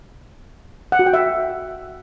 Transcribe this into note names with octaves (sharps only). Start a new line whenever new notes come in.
F#5
F#4
G5
E5